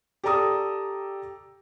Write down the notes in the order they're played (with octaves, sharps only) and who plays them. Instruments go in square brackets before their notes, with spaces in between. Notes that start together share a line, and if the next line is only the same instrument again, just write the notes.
[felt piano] G4 A4 D5 A#5 D#6 E6